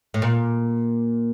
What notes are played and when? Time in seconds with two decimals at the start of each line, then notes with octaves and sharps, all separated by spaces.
0.14 A2
0.22 A#2